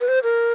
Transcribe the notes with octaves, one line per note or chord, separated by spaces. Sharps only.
B4
C5
A#4